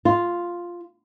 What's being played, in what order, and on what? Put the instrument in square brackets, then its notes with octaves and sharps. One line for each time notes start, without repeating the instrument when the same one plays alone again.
[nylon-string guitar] F4